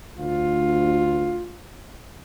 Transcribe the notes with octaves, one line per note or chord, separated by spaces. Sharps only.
D2 F4